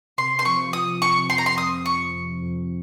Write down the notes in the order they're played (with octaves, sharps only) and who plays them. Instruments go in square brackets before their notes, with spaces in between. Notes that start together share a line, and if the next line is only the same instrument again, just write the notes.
[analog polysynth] C3 [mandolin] C6
[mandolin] C6
[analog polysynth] F3 [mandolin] C#6
[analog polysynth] F3 [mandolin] D#6
[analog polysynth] C3 [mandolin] C#6
[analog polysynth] F2 [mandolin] C6
[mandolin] A#5
C6
[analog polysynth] F3 [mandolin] D#6
[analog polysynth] C3 [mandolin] C#6
[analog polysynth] F2
F2